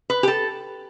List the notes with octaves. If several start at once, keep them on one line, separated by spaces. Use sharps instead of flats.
B4
G4
A4